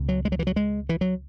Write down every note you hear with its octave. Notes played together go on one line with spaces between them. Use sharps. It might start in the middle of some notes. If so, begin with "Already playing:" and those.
Already playing: C#2 B2
F#3
G#3
F#3
E3
F#3
G#3
E3
F#3